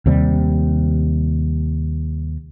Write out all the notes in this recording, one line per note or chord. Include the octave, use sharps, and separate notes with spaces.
D#2 C3 G3